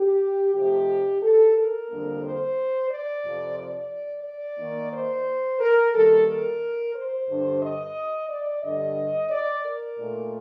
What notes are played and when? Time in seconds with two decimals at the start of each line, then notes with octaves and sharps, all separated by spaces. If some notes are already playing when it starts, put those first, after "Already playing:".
Already playing: G4
0.54 C3 F3 A3 D#4 G4
1.22 A4
1.56 A#4
1.89 F2 D3 G3 A#3 D4
2.23 C5
2.90 D5
3.24 F2 C3 F3
3.58 D5
4.24 D5
4.59 D#3 A#3 D#4
4.92 C5
5.60 A#4
5.94 D#3 G3 A#3 A4
6.27 A#4
6.95 C5
7.28 G2 D3 G3 D4
7.61 D#5
8.29 D5
8.63 G2 D3 G3 D#5
9.30 D5
9.64 A#4
9.98 A#2 A3 D#4